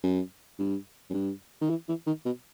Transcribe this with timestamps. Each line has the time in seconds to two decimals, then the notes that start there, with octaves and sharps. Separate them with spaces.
0.04 F#2
0.59 G2
1.10 F#2
1.14 G2
1.61 D#3
1.70 E3
1.89 E3
2.07 D#3
2.26 B2